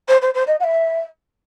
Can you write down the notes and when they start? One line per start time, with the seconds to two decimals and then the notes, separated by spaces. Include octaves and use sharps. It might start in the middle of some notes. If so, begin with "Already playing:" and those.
0.08 C5
0.21 C5
0.34 C5
0.47 D#5
0.60 F#5
0.64 E5